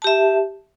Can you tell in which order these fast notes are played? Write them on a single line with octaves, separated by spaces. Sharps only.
A5 G4 E5